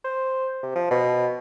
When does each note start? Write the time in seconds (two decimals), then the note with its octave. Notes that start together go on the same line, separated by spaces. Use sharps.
0.04 C5
0.63 C3
0.76 F3
0.91 B2